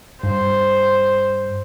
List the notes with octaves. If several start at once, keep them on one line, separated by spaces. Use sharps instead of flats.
G2 C5